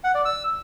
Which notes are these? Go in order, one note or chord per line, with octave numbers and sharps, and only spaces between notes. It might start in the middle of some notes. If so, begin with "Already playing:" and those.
F#5
D5
E6